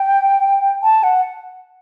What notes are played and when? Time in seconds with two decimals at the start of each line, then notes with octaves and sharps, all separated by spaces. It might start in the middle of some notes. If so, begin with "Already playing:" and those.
Already playing: G5
0.83 A5
1.03 F#5